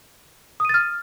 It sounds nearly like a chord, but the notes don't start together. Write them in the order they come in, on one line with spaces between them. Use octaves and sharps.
D#6 D#7 A6 F6